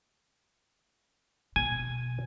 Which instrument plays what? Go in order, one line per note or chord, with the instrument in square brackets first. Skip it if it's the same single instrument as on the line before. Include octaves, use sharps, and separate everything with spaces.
[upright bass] B2 [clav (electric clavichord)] G#5